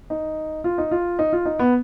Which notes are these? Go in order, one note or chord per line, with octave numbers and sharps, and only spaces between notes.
D#4
F4
D#4
F4
D#4
F4
D#4
B3